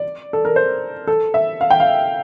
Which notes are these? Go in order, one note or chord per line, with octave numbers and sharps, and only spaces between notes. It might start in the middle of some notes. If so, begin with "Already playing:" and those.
Already playing: D5
A4
A#4
C5
A4
E5
F5
G5
F5